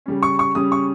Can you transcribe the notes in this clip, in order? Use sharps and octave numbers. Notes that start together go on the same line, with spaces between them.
C#3 G3 C#4
C#6
C#6
C#3 G3 C#4 D#6
C#6